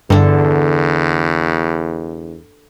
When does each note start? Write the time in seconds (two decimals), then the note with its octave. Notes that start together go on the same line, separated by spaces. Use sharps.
0.10 E2 G2 D3 A4